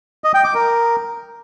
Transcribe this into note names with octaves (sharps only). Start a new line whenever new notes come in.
D#5
G5
D6
A#4